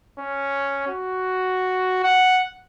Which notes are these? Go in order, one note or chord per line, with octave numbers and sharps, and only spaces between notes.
C#4
F#4
F#5